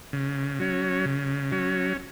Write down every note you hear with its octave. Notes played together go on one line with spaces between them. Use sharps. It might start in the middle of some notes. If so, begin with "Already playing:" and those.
C#3
F#3 C#4
C#3
F#3 C#4